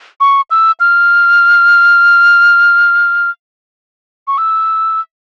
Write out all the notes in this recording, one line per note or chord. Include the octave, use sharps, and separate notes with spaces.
C#6
E6
F6
C#6
E6